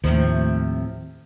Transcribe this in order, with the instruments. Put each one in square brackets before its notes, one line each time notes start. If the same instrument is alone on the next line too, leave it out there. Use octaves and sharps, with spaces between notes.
[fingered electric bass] D#2 [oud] A2 C3 F3